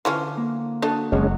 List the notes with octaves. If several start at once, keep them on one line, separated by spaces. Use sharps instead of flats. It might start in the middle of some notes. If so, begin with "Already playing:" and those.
D3 E3 F3 C#4 C6
A#3
D4 F#4 A4 D#5
F#1 F#2 F#3 G#3 C#4